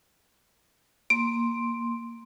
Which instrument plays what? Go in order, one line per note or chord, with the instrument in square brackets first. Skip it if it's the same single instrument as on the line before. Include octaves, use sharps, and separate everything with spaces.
[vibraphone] A#3 C6 [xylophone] D7